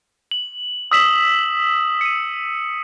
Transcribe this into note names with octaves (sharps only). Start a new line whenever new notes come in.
F#7
D#6 E6 B6 E7 F#7
C#7 D#7